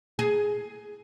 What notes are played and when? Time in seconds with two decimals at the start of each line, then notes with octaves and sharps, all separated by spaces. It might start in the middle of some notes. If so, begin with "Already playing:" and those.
0.19 G#4